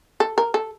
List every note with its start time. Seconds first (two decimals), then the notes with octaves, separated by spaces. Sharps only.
0.20 A4
0.38 A#4
0.54 A4